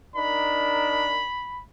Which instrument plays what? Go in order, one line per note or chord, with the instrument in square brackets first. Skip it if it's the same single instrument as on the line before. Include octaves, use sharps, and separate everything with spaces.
[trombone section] D4 D#4 A#4 [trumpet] B5